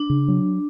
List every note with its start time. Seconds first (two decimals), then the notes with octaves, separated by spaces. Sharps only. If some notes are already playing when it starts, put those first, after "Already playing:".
Already playing: D4
0.10 C#3
0.28 F#3